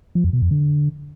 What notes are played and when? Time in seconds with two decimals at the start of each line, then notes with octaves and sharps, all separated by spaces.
0.15 F3
0.24 F2
0.33 B2
0.42 F2
0.51 D3